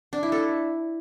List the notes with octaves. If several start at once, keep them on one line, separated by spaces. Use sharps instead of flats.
D4
E4
A4